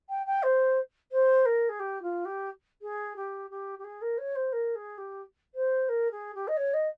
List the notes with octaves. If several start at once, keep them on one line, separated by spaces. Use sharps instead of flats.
G5
G5
C5
C5
A#4
G#4
G4
F4
G4
G#4
G4
G4
G4
G#4
A#4
C#5
C5
A#4
G#4
G4
C5
A#4
G#4
G4
D#5
C#5
D#5